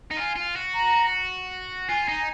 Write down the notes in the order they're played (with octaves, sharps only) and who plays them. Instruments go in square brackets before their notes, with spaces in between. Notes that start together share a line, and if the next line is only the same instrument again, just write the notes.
[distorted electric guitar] D#4
[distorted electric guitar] F4 [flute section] G#5
[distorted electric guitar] F4
F#4
[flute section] A#5
[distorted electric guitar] F4 [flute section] G#5
[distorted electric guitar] D#4